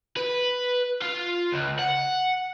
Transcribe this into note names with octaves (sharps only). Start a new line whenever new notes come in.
B4
F4
C#2
F#5